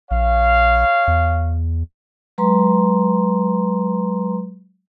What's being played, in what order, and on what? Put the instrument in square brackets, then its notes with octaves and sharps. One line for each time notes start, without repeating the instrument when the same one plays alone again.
[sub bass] A#1 [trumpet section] C#5 F5
[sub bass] E2
[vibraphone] F#3 G#3 B4 A#5 C6